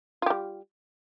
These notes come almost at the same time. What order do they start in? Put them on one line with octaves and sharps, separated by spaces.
F4 G4 G3